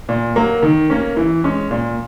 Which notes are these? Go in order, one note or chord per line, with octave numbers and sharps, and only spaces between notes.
A#2
F#3 A#3
D#3
A#3 C#4
E3
G#3 C#4
A#2